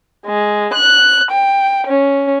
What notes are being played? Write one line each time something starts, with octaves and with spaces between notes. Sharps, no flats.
G#3
F#6
G5
C#4